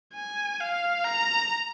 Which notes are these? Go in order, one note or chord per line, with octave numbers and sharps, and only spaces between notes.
G#5
F5
A#5